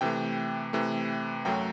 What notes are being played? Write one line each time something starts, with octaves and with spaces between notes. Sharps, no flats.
C3 E3 A3 G5
C3 E3 A3
F#2 F#3 A3 G5